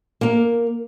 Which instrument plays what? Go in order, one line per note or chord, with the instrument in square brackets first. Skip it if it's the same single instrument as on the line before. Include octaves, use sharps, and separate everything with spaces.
[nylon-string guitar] A#3 A#4